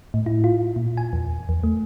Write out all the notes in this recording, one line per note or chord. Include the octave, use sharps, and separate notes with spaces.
A2
E4
F4
A#2
G#5
E2
E2
A3